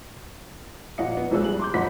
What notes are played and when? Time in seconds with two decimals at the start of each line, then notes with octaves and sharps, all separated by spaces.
0.98 A#2 F3 F4 D#5 F#5 C#7
1.17 B3
1.31 A#1 A#2 F3 G#3 E6 F#6
1.44 G3 G#4 F#7
1.60 C6 D6 G6
1.74 F#1 F3 D#5 F#5 B5 B6